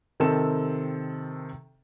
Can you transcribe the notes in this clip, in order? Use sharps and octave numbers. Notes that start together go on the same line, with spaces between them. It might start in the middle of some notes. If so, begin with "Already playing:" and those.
C3 D#3 C4 A4 E7